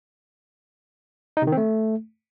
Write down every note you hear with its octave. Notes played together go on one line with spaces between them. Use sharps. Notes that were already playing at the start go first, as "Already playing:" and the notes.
D#4
C3
D#3
C4
A3